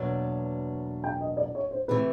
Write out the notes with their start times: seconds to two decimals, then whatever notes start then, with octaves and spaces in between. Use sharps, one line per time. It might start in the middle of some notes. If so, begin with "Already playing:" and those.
Already playing: E2 B2 F#3 A#3 D4
1.04 G5
1.21 D#5
1.37 D5
1.55 C#5
1.71 C5
1.88 C3 E3 A3 B4